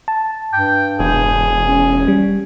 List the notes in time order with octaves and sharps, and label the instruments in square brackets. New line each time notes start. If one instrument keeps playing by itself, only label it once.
[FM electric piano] A5
[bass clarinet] G2 [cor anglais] G5
[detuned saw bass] E1 [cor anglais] G#4
[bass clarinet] C#4
[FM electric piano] G3